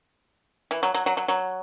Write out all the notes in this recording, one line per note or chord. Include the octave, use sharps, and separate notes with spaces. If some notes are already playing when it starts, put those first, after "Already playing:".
E3
F#3
F#3
F#3
F#3
F#3